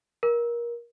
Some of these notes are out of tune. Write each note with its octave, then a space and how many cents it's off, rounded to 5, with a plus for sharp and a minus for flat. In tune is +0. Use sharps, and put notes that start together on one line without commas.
A#4 +25